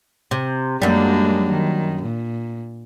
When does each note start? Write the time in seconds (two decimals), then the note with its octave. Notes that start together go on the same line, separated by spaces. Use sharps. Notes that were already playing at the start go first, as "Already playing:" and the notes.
0.31 C3
0.82 F#2 G3 G#3 A#3 D4
1.50 D#3
2.03 A#2